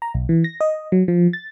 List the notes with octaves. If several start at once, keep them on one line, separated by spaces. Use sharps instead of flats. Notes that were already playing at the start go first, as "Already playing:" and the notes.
A#5
B1
E3
A#6
D#5
F#3
F3
A6